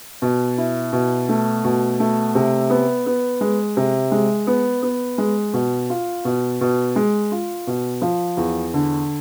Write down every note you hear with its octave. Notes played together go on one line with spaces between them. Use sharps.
B2
E4
B2
A3
B2
A3
C3
B3
B3
G#3
C3
G#3
B3
B3
G#3
B2
F4
B2
B2
G#3
F4
B2
F3
E2
D3